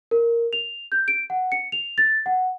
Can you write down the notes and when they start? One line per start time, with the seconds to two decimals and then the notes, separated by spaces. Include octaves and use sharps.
0.11 A#4
0.53 F7
0.92 G6
1.08 D7
1.30 F#5
1.52 C#7
1.72 F7
1.98 A6
2.26 F#5